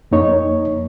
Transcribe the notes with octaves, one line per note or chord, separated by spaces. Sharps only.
F2 A#3 D#4 C#5